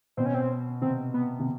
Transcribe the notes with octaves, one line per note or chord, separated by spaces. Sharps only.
B2 C4
C#4
C4
C3 C4
B3
C3